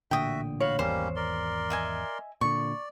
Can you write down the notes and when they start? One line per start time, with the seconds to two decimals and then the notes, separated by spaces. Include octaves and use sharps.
0.11 A1 A#2 D3 F#4 E5 G5 D#6
0.60 F#4 C#5 F5 B5
0.79 G#1 E2 G3 A#3 C#4 C5
1.16 A#4 D5 C6
1.70 D#5 E5 G#5
2.41 A#2 D3 D5 C#6